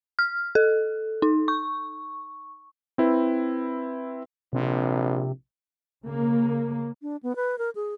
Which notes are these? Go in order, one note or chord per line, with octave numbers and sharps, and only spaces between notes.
F6
A4
D#4
C#6
C4 E4 B4
A#1 C3
C#3 A#3
D4
B3
B4
A#4
G#4